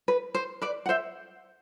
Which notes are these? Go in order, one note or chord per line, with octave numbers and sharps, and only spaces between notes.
B4
C5
B4 D5
F#5
C5 E5